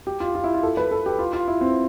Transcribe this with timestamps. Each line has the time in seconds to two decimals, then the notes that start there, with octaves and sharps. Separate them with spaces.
0.07 G4
0.20 F4
0.35 F4
0.44 E4
0.54 F4
0.63 A4
0.77 B4
0.91 A4
1.06 G4
1.19 F4
1.33 F4
1.48 E4
1.61 C4